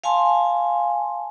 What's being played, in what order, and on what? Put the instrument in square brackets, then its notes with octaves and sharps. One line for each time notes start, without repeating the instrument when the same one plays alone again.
[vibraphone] F5 G#5 A5 C6